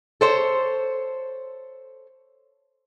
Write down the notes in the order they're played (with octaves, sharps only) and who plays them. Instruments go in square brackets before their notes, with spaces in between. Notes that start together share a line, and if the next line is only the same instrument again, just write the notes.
[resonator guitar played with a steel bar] A4 C5 C#5